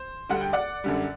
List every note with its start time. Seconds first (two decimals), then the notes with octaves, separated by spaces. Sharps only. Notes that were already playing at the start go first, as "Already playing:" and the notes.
Already playing: C5
0.29 D2 D3 G3 F#5
0.41 G5
0.53 D5 F#5
0.84 F#2 D3 G3